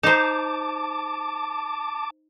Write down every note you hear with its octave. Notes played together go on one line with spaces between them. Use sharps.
D#4 C5 A5 D6